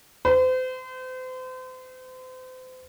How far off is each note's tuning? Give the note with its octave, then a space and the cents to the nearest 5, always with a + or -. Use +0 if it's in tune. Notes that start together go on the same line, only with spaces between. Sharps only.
C5 -35